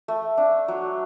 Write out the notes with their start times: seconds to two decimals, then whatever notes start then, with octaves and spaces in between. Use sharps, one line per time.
0.08 A3
0.37 D4
0.68 F#3